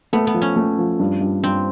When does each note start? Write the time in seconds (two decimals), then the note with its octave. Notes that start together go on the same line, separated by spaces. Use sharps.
0.13 A3 B3
0.27 B3
0.34 F3
0.42 C#4
0.56 A3
0.78 F3
0.99 G2
1.21 G2
1.43 G2 C4